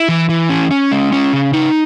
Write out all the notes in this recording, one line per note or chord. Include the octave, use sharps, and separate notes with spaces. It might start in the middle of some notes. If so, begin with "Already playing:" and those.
Already playing: E4
E3
E3
C#4
C#4
G#3
C#4
C#3
D#4